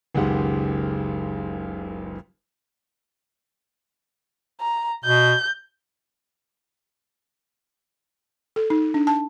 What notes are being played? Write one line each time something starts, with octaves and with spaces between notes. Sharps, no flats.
F#1 C#2 D#3 G#3 G4 F#5
A#5
B2 G6
A4
D#4
D4
A5